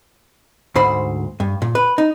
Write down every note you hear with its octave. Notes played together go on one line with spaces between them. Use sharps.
D2 G#2 C5 B5
G2
A#2
B4
D#4